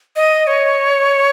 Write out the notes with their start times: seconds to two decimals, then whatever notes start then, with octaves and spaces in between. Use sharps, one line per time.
0.16 D#5
0.47 C#5